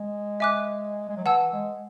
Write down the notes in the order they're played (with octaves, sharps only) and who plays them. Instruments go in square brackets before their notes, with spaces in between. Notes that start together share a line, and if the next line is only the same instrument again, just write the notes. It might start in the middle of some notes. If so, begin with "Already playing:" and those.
Already playing: [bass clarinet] G#3
[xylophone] E5 G#5 D6 F#6
[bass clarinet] G#3
F#3
[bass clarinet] E3 [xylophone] F#5 A5 E6
[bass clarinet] G#3